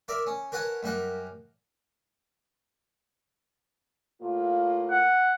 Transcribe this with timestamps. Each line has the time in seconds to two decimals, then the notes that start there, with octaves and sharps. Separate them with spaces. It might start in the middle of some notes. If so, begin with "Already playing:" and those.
0.08 A#4 D5 E5
0.27 C#4
0.52 A#4 B4 C#5 F#5 G#5 A5
0.83 F#2 G3 A#4 F#5
4.22 A2 A#3 F4
4.91 F#5